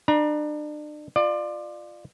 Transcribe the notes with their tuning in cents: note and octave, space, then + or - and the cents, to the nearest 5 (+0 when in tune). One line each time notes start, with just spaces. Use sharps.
D4 +35 A#5 +35
F4 +0 D5 +30